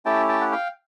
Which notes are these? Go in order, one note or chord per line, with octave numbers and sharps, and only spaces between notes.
A3 C#4 E4 G4 G5 A5
G5 A5
F#5
F5 G5